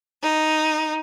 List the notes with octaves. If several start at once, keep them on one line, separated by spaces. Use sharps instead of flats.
D#4